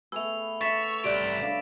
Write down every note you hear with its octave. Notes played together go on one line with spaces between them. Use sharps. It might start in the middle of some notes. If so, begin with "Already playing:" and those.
A3 B3 G#4 E6 F7
A4 C#5 D#5 E5 A6 B6 E7
C2 G4 C#5 D5 D7
D3 G3 C#5 F5